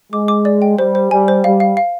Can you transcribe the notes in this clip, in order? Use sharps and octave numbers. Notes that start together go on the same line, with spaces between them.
G#3 D6
D6
D5
G5
G3 C5
C5
G3 G#5
C5
G3 F5
F5
F5